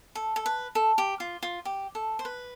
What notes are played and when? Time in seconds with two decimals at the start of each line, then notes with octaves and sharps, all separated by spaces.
0.15 A4
0.36 A4
0.46 B4
0.75 A4
0.98 G4
1.20 F4
1.43 F4
1.65 G4
1.95 A4
2.19 C5
2.25 B4